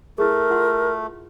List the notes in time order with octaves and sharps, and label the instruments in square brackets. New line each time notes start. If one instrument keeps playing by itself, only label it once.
[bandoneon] A3 [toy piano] E4 G#4 [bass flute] A#4
[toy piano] F4 F#5 C6